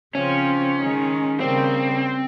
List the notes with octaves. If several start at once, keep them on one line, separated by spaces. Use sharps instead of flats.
C#3 F3 C4 C#4 F4
D#3 G#3 D#4
C#3 G3 A#3 C4